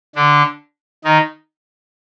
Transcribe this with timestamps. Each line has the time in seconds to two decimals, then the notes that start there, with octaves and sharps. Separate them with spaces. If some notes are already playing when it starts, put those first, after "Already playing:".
0.15 D3 D4
1.04 D#3 D#4